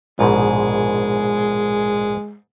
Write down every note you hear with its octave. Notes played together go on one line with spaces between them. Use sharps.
A#1 G#2 B2 G#3